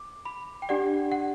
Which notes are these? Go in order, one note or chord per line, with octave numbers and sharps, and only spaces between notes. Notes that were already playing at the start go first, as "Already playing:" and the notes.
Already playing: D6
B5
G5
D4 G4 D5 F#5
F#5